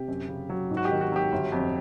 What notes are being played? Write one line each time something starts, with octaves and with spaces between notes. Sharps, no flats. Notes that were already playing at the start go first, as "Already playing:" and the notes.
Already playing: C3 G4
F#2
C#3
F#3
G#2
F#4
G4
D#3
F#4
F#3 G4
G1
F2